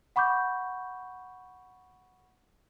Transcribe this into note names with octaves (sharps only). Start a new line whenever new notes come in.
F#5 B5 C#6 D6 G6